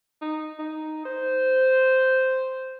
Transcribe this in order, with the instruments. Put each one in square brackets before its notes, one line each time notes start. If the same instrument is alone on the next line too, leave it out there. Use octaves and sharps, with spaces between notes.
[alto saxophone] D#4
D#4
C5